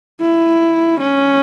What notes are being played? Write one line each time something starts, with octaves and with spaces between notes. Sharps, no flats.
E4
C#4